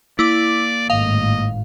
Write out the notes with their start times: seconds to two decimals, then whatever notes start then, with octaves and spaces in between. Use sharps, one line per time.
0.19 A#3 E4 D5 D6
0.90 G#1 A2 D#5 F5